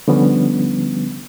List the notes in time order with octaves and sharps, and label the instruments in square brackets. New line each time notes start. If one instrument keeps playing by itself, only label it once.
[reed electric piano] D3 F3 G3 B3 C#4